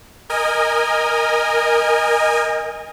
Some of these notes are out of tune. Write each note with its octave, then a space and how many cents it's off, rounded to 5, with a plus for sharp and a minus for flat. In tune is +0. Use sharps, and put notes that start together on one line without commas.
A#4 +0 D#5 +0 G#5 -20